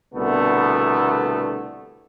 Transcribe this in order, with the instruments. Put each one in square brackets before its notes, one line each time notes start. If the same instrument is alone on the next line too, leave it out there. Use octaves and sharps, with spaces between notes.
[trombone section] C2 B2 D3 A3 B3